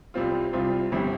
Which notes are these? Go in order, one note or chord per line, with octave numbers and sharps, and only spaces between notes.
C2 C3 G3 C4 F4
C2 C3 G3 C4 F4
G1 G2 G3 C4 E4